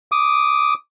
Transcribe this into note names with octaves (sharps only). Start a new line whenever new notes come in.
D6 D#6